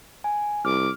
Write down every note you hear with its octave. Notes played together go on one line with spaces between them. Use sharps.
G#5
C2 D6 F6